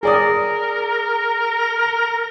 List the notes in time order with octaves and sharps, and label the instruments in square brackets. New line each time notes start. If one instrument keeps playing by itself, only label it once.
[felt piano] G#4 D5 D#6 [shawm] A#4